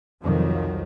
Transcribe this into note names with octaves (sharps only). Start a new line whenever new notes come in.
C2 F2 D#3 F3 F#3